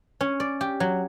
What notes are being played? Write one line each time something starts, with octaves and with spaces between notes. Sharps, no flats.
C#4
D5
G4
F#3